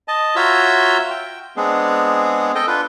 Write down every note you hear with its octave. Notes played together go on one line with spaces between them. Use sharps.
D#5 A5
F4 F#4 C#5 E5 A#5 E6
G5
G#3 B3 C4 D4 G#4
A4 D#5 G5
D4 F4 B4